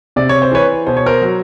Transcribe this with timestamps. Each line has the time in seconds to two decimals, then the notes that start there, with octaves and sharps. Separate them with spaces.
0.16 C3 D5
0.29 C#5
0.42 C5
0.52 E3 B4 C#5
0.87 B2 C5
0.97 C#5
1.06 A#4 C5
1.22 F#3